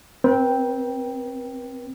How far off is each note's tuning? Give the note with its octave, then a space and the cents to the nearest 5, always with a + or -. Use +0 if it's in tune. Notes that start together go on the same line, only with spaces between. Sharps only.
C4 +0 B4 -45 G5 +0